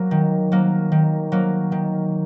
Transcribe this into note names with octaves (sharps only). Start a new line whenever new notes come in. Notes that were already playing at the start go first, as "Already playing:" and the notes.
Already playing: F#3 A#3
D#3
F#3 A#3
D#3
F#3 A#3
D#3